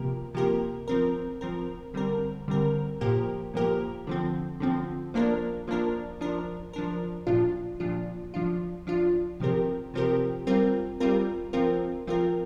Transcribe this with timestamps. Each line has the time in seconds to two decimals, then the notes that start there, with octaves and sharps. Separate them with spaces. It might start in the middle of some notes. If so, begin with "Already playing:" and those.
Already playing: C3 F3 A#3 G4 A#4
0.34 C3 F3 A#3 G4 A#4
0.88 F3 C4 A#4
1.41 F3 C4 A#4
1.94 D3 G3 C4 A#4
2.48 D3 G3 C4 A#4
3.01 A#2 F3 A#3 G4 A#4
3.54 A#2 F3 A#3 G4 A#4
4.07 D3 F3 C4
4.60 D3 F3 C4
5.14 F3 A#3 D4 A#4
5.67 F3 A#3 D4 A#4
6.21 F3 D4 A#4
6.73 F3 D4 A#4
7.27 A#2 F3 D4 F4
7.80 A#2 F3 D4 F4
8.34 F3 D4 F4
8.87 F3 D4 F4
9.40 C3 F3 C4 G4 A#4
9.94 C3 F3 C4 G4 A#4
10.47 G3 C4 F4 A#4
11.00 G3 C4 F4 A#4
11.53 F3 C4 F4 A#4
12.07 F3 C4 F4 A#4